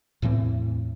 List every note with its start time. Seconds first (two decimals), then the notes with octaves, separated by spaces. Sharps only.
0.22 E2 A2 E3 C4